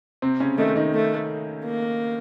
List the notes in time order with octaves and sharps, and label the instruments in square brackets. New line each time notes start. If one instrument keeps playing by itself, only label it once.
[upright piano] C3 C4
C#3 C#4
[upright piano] D#3 D#4 [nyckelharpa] A3
[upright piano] D#3 D#4
[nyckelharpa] A3
A#3